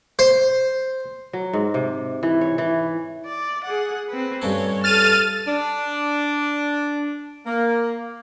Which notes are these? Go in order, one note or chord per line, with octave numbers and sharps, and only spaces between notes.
C5
F#3
G#2
C3
E3
C#5
E3
D5
G#4 F#5
C4 B4
G2 A3 C#4 C#5
A4 A5 F6 A6 D#7
D4
A#3